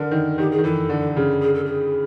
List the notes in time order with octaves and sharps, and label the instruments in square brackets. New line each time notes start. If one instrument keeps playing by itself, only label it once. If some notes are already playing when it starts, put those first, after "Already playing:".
Already playing: [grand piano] D3 [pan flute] A#4
[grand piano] D#3
[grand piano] D#3 [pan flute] G4
[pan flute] G#4
[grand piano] D#3
[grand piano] E3 [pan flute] A4
[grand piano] D3
C#3
[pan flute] G#4
A4
G#4